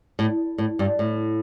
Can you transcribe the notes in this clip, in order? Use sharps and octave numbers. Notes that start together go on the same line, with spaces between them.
A2
A2
G2
A2